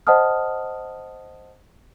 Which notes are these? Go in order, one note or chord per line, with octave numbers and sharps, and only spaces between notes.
C5 D#5 F#5 A5 D#6 F6